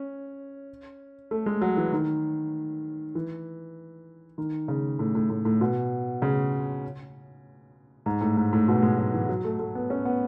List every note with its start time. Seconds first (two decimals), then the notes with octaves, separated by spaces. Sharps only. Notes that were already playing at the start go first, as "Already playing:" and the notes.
Already playing: C#4
1.31 A3
1.46 G#3
1.62 F#3
1.77 E3
1.92 D#3
3.15 E3
4.38 D#3
4.68 C#3
4.99 A2
5.15 A2
5.30 A2
5.45 A2
5.61 B2
6.22 C#3
8.06 G#2
8.21 A2
8.37 G#2
8.53 A2
8.68 B2
8.82 G#3
8.98 F#3
9.14 E3
9.29 F#3
9.45 A3
9.59 A3
9.75 B3
9.90 C#4
10.05 B3